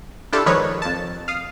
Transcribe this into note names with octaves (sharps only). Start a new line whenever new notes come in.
D4 E4 F4 G4 A4 A5
D#3 F3 G#3 B4 C#5
F2 A5
F5 D#6